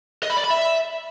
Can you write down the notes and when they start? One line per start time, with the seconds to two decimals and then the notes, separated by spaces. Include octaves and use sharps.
0.23 D#5
0.30 B5
0.37 D5
0.44 B5
0.50 E5